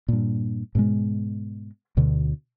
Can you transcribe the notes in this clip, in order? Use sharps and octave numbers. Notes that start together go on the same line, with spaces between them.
G2 A#2
G#2 B2 G#3
D2 B2 D3